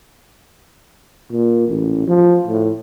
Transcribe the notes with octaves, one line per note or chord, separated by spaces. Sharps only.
A#2
A1
F3
A2